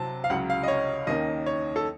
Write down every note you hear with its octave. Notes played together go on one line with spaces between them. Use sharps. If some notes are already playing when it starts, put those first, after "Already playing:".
Already playing: C3 F#3 C4 A5
F5
C#2 C#3 F#3 F#5
F5
D#5
C#5
D#2 D#3 A#3 C#4 D#5
C#5
A4